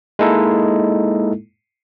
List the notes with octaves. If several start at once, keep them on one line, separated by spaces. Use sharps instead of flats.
G#3 A#3 D#4 E4 A4